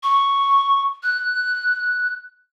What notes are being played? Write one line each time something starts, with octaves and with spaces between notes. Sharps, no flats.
C#6
F#6